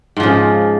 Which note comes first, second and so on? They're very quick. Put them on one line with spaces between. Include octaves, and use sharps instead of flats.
G#2 F3 C#3